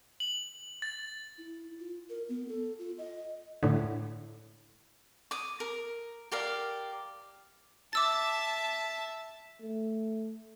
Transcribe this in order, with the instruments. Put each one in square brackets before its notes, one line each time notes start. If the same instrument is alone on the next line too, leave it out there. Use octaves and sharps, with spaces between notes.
[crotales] F#7
A6
[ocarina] E4
F4
A#4
B3
A4
F4
D#5
[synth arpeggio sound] A2 D3
[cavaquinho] D6 D#6
A#4
G4 A#4 D5 F5
[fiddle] E5 A5 [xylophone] D6 E6 A6
[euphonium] A3